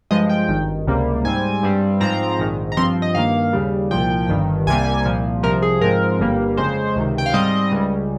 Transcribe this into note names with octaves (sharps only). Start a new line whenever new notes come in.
G2 F3 G#3 D#5
G5
G#1 G2 D#3
C#2 C3 G3 A#3
G#2 G3 C4 G#5
G2 G3 C4
G#2 F3 C4 A#5
A#1 G#2 D#3
A#5
G2 F3 C4 C6
D#5
G2 D#3 A#3 F5
D#2 C#3 G3
C2 A#2 F3 G5
G1 G2 D#3
C2 C3 G3 A#3 G#5
C2 A#2 F3
C2 C3 F3 A#4
G#4
G#2 F3 G#3 C4 A#4
G1 G2 G3 A#3
F2 C#3 G#3 C5
C#2 C3 D#3
G5
F5
G#2 G3 C4 D#5
C#2 C#3 G3